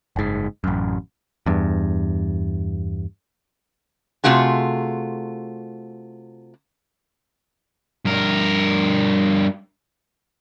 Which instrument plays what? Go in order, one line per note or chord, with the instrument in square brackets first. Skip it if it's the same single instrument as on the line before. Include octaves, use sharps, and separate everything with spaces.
[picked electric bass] F#1 G#2
A1 F#2
E2 G2
[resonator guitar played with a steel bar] C3 A3 F4 F#4 G#4
[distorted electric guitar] G2 A#4